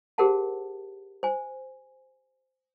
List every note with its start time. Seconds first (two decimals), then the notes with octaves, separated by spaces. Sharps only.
0.18 G4 G#4 A#4 C5 F#5 A5
1.23 C5 G#5